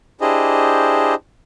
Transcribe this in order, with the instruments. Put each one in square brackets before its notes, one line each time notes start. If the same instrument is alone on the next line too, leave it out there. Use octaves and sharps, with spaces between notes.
[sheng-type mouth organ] D4 E4 G4 G#4 C5 D#5